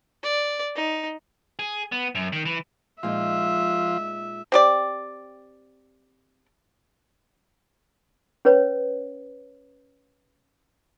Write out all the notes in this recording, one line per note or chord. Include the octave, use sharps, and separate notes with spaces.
D5
D#4
G#4
B3
F#2
D#3
E3
A#2 F3 G#3 D#4 F4 E5
C4 G4 D5
C#4 B4 C#5